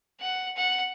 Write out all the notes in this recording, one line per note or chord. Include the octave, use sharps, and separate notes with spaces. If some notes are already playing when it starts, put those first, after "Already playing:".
F#5
F#5